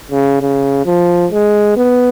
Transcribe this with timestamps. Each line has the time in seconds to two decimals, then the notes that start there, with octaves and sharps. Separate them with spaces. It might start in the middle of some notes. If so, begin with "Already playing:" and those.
0.11 C#3
0.41 C#3
0.86 F3
1.31 G#3
1.76 B3